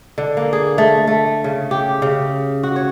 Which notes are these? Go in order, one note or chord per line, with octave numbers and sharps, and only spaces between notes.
D3
A#3
G#4
A3
A3
C#3
G4
C#3
F#4
C#5